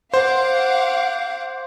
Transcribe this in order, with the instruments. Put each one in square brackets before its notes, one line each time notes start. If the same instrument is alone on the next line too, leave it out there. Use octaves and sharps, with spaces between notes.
[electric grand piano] C5 [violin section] F5 F#5 D6